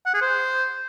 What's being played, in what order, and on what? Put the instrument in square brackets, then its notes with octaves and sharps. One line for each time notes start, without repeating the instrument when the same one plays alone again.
[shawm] F#5
G#4
C5